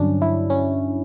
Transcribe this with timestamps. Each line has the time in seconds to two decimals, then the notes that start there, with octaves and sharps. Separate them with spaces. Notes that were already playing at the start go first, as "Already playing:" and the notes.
Already playing: G2 D3 F#3 C#4 D4
0.22 E4
0.50 C#4